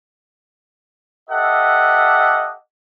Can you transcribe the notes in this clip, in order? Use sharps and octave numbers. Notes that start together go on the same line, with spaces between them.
G4 A4 D#5 E5 F#5